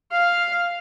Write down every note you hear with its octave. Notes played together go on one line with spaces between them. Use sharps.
F5